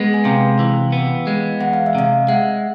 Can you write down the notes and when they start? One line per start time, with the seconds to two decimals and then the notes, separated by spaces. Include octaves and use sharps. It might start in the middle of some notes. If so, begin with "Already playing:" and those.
Already playing: G#3 B3
0.14 G#5
0.25 C3 F5 G5
0.59 E3
0.92 B3
1.27 G#3
1.60 E2 F#5
1.73 F5
1.86 E5
1.95 C3 D#5 F5
2.28 G#3 E5 F#5